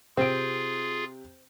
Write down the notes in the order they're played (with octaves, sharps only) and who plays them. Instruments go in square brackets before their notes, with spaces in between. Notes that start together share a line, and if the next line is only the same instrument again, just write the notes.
[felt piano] C3 D7 [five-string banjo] C4 [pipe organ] F4 G#4